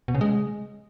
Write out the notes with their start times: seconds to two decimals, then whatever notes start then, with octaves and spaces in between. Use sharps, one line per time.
0.08 B2
0.15 C#3
0.21 G#3